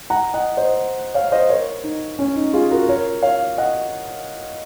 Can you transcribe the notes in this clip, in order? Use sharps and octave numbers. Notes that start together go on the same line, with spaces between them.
F#5 A#5
D#5 F#5
C5 D#5
C#5 F5
C5 D#5
A#4 C#5
D#4
C#4
D#4
F4 G#4
F#4 A#4
A#4 C#5
C#5 F5
D#5 F#5